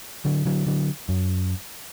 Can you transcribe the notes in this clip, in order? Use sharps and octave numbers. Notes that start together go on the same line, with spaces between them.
D3 F#3
D3 F#3
D3 F#3
F#2